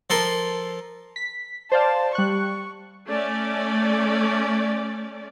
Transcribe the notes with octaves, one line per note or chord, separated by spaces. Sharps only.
F3 A4 A#4 C6
B6
C5 D5 F5 A5
G3 C#6 F#6
A3 C#4 D5